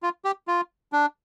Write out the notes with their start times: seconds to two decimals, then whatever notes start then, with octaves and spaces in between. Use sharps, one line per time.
0.03 F4
0.25 G4
0.48 F4
0.92 D4